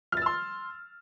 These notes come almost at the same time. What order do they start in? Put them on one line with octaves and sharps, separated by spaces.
F6 A6 E6 C6